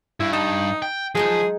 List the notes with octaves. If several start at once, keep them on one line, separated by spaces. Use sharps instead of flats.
G2 E4
D#4 A5
G5
F3 F#3 G#3 D#4 G#4